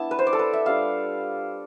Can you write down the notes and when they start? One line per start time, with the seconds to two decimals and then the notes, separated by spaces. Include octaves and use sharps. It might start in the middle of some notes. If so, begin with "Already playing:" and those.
Already playing: B3 D4 E4 A5
0.11 B4
0.19 C5
0.27 D5
0.33 A4
0.39 B4
0.53 E5
0.66 G3 D4 F4 F5